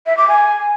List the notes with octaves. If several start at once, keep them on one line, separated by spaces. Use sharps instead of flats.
E5
D6
G#5